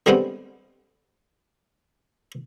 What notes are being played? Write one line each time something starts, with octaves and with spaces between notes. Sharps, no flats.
D3 G3 G#3 B3 C4